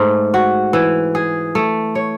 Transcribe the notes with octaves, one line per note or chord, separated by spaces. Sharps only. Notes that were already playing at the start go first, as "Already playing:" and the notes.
Already playing: G#2 A3
F#4
E3
G#4
A3
C#5